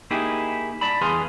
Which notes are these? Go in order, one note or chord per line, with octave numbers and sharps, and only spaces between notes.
A#3 D#4 E4 G4 G#4
D5 A5 B5
E2 G#4 B4 F5 G#5 C6